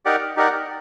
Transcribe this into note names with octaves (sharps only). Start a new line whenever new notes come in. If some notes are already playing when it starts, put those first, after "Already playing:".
D#4 G4 A#4 D5 F#5
D#4 G4 A#4 D5 F#5